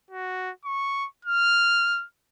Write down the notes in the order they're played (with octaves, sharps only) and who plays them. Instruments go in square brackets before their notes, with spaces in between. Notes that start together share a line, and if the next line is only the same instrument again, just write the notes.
[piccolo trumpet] F#4
C#6
F6